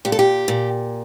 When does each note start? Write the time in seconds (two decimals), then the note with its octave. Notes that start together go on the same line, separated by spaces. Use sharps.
0.05 A#2 G4
0.12 A4
0.19 G4
0.48 A#2